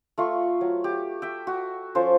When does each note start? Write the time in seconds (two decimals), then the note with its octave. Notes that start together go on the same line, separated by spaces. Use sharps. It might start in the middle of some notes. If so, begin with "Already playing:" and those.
0.18 A3 F4 C#6
0.61 F#3
0.84 G4
1.22 E5 G5
1.47 F#4
1.95 F3 C#4 A4 C5